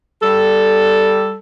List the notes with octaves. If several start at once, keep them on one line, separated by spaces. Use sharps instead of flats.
G3 A4